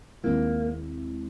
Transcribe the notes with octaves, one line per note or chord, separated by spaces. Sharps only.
D#2 D#3 G#3 A#3 C4 E4